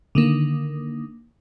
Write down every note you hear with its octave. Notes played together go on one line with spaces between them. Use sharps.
D3 D#3 A#3